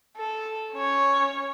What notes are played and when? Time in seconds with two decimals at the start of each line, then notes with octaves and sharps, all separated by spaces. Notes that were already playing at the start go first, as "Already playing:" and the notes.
0.17 A4
0.72 C#4 C#5